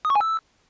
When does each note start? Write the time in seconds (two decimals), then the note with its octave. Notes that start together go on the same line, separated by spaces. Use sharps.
0.05 D#6
0.10 C#6
0.15 G#5
0.21 E6